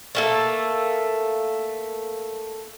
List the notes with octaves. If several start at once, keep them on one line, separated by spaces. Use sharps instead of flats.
A3 A#3 A4